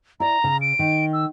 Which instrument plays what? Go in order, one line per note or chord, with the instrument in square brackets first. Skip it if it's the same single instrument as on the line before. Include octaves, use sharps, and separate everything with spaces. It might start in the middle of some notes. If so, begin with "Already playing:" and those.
[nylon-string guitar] E4 D5 [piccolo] A#5
[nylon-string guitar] C#3
[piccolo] D7
[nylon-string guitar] D#3
[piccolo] E6